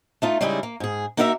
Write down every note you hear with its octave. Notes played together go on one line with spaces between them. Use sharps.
A3 D#4 F4
C#3 G3 G#3 D#4 E4 G#4
A#3
G#2 G#4
A#3 D#4 F#4 A#4 D5 E5